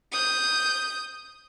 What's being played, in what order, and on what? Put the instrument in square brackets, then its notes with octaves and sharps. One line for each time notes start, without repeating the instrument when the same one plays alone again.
[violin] D#6 G6